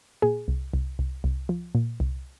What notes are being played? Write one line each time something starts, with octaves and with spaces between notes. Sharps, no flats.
A#2 G#4
C2
C2
C2
C2
F3
A#2
C2